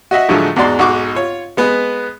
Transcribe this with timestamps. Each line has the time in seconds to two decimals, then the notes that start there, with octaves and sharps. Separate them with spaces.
0.11 F#4 D#5 E5 F#5
0.29 A2 D3 F3 F#3 G#3 A3
0.56 E2 G#2 F#4 D5 C6
0.79 B1 G#2 F#4 C#6 D6
1.15 F4 C#5
1.57 G#3 B3 B4